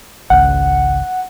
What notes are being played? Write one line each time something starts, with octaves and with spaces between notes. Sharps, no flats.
G#1 C#2 F#5